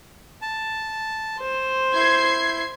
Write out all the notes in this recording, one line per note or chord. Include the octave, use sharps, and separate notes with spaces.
A5
C5
E4 G6 G#6 C7